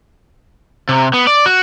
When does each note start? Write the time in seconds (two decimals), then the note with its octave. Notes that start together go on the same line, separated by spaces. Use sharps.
0.89 C3
1.13 B3
1.27 D5
1.46 F#4